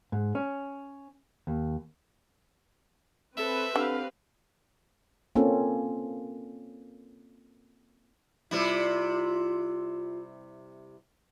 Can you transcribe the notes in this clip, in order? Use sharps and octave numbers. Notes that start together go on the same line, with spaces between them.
G#2
C#4
D#2
C4 A4 B4 E5
D3 G4 F5
A#3 C4 C#4 F4 A4
C3 G3 E4 F4